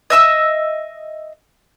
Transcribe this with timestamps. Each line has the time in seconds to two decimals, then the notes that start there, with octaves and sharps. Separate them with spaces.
0.10 D#5 E5 E6